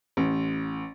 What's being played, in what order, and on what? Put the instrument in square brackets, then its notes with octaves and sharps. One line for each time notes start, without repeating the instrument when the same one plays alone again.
[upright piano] A1